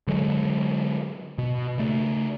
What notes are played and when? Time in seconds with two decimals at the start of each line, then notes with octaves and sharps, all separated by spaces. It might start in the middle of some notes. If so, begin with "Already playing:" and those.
0.07 D3 F#3 G#3
1.38 B2
1.78 C#3 A3